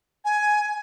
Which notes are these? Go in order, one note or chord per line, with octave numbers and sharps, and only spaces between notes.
G#5